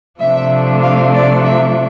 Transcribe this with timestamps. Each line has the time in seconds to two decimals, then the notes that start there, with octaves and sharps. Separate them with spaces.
0.21 C3 F3 A3 D4 E5
0.83 F5
1.15 D5
1.45 E5